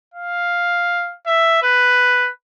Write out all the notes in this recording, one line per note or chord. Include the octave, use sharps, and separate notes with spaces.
F5
E5
B4